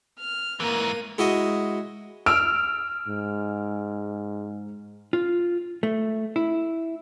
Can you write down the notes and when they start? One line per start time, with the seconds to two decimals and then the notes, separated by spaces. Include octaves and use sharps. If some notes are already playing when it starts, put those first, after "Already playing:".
0.19 F6
0.60 G#2 E3 A#3 D#7
1.18 G#3 E4 F#4 D#5
2.26 E6 F6 D7
3.08 G#2
5.13 F4
5.83 A3
6.36 E4